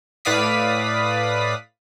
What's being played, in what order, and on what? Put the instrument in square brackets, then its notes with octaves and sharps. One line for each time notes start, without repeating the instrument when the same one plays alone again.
[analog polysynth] A2 B4 D5 F5 D#6 B6